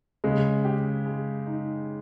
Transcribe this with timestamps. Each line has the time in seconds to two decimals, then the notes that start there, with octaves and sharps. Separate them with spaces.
0.24 C#3 G#3
0.65 G4
1.06 G#3
1.46 D#4